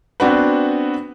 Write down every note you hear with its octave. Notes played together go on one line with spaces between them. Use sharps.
B3 C4 D4 F#4 B4